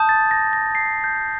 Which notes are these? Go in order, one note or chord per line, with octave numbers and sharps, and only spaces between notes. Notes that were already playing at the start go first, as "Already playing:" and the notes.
Already playing: A5 D#6 G6
A6
A#6
A#6
C7
G6